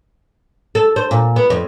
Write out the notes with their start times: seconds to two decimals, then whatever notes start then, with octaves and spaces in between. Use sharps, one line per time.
0.75 A4
0.96 C5
1.11 A#2
1.36 B3
1.50 F2